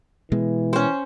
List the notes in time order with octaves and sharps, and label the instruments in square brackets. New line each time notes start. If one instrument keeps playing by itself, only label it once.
[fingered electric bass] B2 G#3 [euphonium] E3
[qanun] C#4 C5